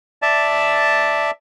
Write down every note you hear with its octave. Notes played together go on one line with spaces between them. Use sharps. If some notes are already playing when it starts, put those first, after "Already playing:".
D5 E5 A5